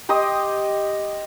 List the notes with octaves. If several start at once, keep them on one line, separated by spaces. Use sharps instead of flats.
G4 D#5 C6 D#6